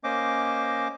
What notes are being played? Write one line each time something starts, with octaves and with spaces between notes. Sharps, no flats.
A#3 C#4 C5 D#5 D6